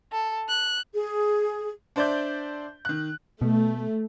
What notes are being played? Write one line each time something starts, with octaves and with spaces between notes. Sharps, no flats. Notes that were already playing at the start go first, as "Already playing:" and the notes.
A4
F#6
G#4
D4 C5 D5 E5 G6
D#3 F#6
B2 A3